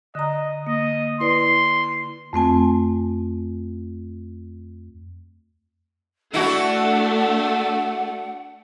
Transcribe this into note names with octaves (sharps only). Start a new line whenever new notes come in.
D3 D#5 A#5
A#3 D#5
E4 B4 D5 C6
F2 A3 C4 G#5
A3 D4 E4 F#4 F#5